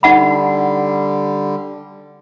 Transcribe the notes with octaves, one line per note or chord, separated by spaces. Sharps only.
D3 G3 D#4 F#5 B5